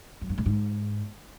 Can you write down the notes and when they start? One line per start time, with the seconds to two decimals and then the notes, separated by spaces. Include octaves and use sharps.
0.21 F#2
0.30 G2
0.38 A2
0.46 G#2